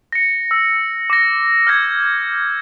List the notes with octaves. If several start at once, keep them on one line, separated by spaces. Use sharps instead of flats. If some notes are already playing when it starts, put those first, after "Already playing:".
A#6 C#7
E6
D6 A#6
F6 G6 G#6 A#6